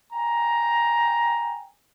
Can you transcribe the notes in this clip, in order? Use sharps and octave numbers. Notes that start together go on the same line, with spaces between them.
G5 G#5 A#5